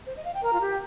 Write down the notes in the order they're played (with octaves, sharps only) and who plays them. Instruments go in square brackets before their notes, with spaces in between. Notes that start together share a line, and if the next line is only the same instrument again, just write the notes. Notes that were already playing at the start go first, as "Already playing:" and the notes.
[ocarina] C5
D#5
F5
G5
[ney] A#4 [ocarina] A#5
[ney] F4
G4
[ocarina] G5